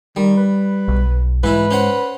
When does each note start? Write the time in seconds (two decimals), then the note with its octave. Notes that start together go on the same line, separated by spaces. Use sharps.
0.16 D#3 G3
0.37 B4
0.88 B1
1.44 G#2 E3 E4 B4
1.71 C#4 C5 F#5